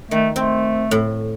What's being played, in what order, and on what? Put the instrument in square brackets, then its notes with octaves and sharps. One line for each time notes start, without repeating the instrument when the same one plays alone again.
[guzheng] D#3 [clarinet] A3
[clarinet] A3 [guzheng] C4
[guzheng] A2